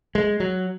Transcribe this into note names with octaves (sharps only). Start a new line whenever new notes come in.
G#3
F#3